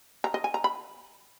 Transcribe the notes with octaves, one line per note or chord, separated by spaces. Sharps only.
A#5
D#5
G#5
A#5
B5